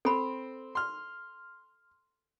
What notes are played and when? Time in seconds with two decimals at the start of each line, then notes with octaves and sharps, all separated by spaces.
0.05 C4 A4 B5
0.75 C6 F6